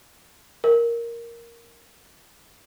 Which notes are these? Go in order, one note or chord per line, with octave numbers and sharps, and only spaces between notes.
A#4